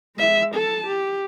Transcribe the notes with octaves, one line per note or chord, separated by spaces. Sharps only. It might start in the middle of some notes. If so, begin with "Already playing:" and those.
G#3 E5
A4 A5
G4